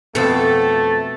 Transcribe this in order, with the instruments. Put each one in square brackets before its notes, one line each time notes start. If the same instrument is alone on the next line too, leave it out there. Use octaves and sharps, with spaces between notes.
[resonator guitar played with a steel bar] F2 A4 [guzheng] B2 C4 [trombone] A3 [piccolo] A6